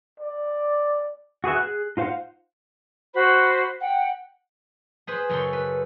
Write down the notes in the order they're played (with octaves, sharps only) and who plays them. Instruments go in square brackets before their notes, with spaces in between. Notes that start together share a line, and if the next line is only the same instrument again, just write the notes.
[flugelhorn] D5
[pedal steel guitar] F#4 G#4 B4 E5
G#4 F#6
D#4 F4 C5 F5 F#5
[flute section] F#4 C5 B5
F#5 G5
[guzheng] G#4 B4 C5
F#2 C#3 A4 C6
B4